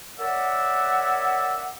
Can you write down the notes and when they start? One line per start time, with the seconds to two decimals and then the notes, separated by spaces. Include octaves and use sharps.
0.19 A#4 C#5 D5 E5 F#5